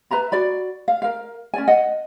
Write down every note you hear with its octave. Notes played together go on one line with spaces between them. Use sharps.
B4 E5 A#5 B5
F#4 D5 B5
F5
A#4 F5
C#4 D5 G#5
D#5 F#5